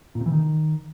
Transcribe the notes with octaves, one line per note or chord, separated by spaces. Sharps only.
A#2
C3
E3
D#3